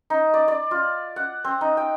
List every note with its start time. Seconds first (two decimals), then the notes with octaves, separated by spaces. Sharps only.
0.10 D#4
0.34 D5
0.48 D5
0.71 F4
1.16 F#5
1.44 C4
1.61 D#4
1.77 G5